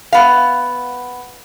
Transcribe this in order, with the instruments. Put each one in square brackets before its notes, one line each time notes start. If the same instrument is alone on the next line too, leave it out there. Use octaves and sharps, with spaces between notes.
[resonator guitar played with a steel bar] B3 F5